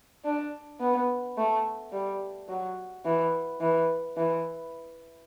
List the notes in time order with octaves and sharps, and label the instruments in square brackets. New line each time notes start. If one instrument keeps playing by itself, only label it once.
[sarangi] D4
B3
A3
G3
F#3
E3
E3
E3